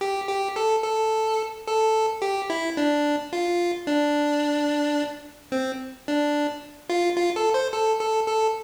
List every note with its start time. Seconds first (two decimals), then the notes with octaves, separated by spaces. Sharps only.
0.01 G4
0.29 G4
0.56 A4
0.84 A4
1.68 A4
2.22 G4
2.50 E4
2.77 D4
3.33 F4
3.87 D4
5.52 C4
6.08 D4
6.90 F4
7.17 F4
7.36 A4
7.54 C5
7.73 A4
8.00 A4
8.28 A4